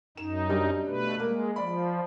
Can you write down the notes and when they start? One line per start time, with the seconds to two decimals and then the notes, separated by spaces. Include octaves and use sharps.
0.17 F#2 D#4 E7
0.50 G3 D4
0.87 B2 A3 B4
1.20 G#3 A#3
1.56 F3 D5 B5